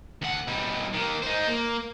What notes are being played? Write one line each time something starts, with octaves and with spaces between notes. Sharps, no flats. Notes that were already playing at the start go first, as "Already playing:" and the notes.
D2 F#5
B2 G3
D#3 A#3
D#4 C5
A#3